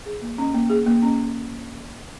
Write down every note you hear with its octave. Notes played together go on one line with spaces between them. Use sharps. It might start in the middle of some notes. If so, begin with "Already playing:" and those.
G#4
A#3
C#4
A#3
G#4
A#3
C#4